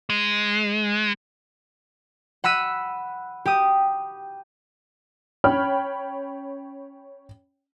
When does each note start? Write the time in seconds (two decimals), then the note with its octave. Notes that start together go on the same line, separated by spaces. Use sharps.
0.10 G#3
2.44 F#5 B5 E6 B6 D#7
3.46 G4 D#6
5.44 C#4 C#5 G5 B5 F6